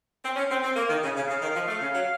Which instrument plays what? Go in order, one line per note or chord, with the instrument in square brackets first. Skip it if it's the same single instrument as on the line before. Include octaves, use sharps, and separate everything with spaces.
[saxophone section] C4
C#4
C4
C4
A#3
D#3
C#3
C#3
[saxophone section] C#3 [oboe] F5
[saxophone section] D#3
F3
A3
C#3
F#3